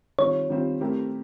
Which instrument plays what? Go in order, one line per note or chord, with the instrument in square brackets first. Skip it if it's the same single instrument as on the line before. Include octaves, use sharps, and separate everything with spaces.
[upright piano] D#3 G3 C4 F4 [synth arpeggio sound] C#5
[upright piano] D#3 G3 C4 F4
A3 C4 E4 G4 A#4